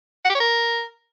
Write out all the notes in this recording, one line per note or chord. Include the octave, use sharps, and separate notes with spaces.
F#5
G4
C#5
A#4